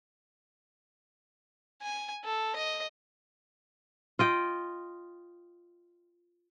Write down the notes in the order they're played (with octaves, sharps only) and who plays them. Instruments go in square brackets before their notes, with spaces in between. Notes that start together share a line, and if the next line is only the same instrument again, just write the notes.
[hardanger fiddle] G#5
A4
D#5
[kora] F4 D#5 G5